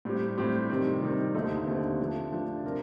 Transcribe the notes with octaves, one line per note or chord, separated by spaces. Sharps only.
A2 G3 C4 G4
A2 G3 C4 G4
C3 D#3 G3 C4
C3 D#3 G3 C4
D#2 D3 A3 C4 D#4
D#2 D3 A3 C4 D#4
F3 A3 D4
F3 A3 D4
C3 F3 C4 G4 A#4